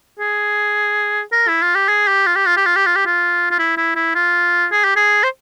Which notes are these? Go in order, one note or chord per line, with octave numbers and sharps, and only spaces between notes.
G#4
A#4
E4
F4
G4
G#4
G4
F4
G4
F4
G4
F4
G4
F4
G4
F4
F4
E4
E4
E4
F4
G#4
G4
G#4
C5